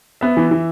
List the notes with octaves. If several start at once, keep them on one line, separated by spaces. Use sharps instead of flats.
B3 E5
E3
E3